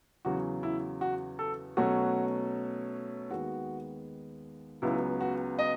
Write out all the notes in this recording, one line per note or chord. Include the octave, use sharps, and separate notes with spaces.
E2 C#3 F#3 F#4
E4
F#4
A4
B2 F#3 A3 C#4 F#4
D#2 D#3 G#3 B3 F#4
C#2 C#3 F#3 B3 E4
F#4
D#5